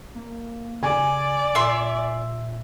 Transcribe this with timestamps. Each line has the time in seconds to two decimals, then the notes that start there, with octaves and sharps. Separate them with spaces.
0.15 A#3
0.83 C#3 D5 G#5
1.55 A#2 E5 C6